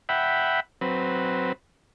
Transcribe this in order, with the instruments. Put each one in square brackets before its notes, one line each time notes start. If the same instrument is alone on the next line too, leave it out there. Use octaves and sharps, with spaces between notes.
[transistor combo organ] E5 F#5 G5 B5
F#3 C4 B4